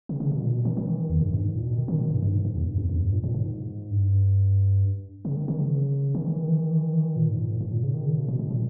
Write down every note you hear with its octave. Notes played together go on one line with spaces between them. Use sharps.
C#3
C#3
B2
A#2
B2
D#3
D#3
E3
D#3
E2
G2
G2
G#2
A#2
B2
D#3
D#3
B2
G2
G2
G#2
G#2
E2
G2
E2
E2
G2
A#2
A#2
G#2
G2
C#3
D#3
D#3
C#3
D#3
E3
D#3
E3
D#3
E3
D#3
E3
D#3
A#2
G#2
A#2
G#2
G#2
A#2
C#3
D#3
C#3
B2
B2
A#2
A#2